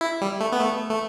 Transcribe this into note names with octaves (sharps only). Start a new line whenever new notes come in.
E4
G3
A3
B3
A3
A3